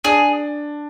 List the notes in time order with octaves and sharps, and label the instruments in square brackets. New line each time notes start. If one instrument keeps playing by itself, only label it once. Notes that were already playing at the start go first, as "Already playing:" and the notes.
[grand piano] D4 [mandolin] G#4